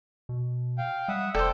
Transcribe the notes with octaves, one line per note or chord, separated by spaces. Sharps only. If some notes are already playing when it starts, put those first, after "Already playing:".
B2
F5 G5
G3 E5 F#5 D#6
F1 A4 C5 D5 G5